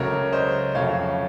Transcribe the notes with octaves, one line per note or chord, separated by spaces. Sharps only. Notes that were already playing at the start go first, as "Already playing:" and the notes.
Already playing: C#2 C#3 F#3 A3 A#4 C#5
C5 D#5
F2 C#3 F#3 A3 C#5 F5